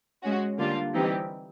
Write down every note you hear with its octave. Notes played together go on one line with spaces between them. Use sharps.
G#3 C#4 F#4
D3 G3 A#3 D4 F4
E3 G3 C4 D#4 G4